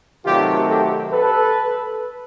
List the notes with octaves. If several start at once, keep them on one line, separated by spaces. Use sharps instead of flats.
C3 D#3 F#3 A3 F4 G4
G4 A4
A4 B4